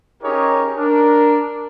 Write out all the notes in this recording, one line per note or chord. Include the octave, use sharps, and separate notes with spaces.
C#4 D#4 G4 G#4 A#4 C#5
D4 A#4